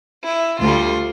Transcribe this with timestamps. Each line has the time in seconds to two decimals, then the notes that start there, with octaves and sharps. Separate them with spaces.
0.25 E4
0.60 D2 D3 G3 F4